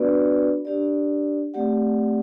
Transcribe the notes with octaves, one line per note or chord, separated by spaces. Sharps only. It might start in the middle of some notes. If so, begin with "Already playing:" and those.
Already playing: B3 D4 F#4 B4 D5
D4 G4 D5
A3 C4 G4 D5 F#5